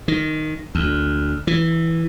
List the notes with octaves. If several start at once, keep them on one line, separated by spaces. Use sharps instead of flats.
D#3
D2
E3